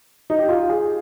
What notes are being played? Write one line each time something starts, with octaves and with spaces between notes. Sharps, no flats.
D#4
G4
F4
G#4